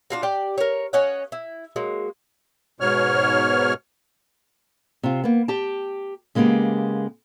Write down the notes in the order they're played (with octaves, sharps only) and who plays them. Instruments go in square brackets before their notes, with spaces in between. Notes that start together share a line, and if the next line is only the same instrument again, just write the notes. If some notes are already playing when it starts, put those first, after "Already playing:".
[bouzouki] D4 F4 F#4
G4 D5 G5
A#4 C#5
C#4 C#5 D#5 F#5
E4
F#3 G#3 A#3
[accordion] G#2 B2 C#5 F6
[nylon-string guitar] C3 F4
A#3 B3
G4 G5 A5
C#3 G#3 A#3 B3 G4